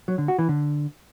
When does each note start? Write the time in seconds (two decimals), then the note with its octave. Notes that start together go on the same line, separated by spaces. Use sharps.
0.08 F#3
0.18 D3
0.28 F#4
0.38 E3
0.49 D3